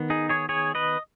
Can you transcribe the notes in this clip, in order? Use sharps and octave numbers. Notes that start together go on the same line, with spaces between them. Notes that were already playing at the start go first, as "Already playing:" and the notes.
Already playing: D#3 B3
D#4 G#4
G#4 C#5
G#4 C#5
B4 D#5